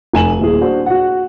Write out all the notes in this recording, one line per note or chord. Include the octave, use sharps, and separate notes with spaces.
F1 G#5 E7 F#7
D#1 E4 G#4
D4 F#4 C5
F#4 F#5